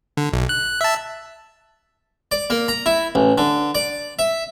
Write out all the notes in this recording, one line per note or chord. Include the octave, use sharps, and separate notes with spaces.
D3
B1
F#6
E5 A5
D5
A#3
A#5
E4
A1
D3
D5
E5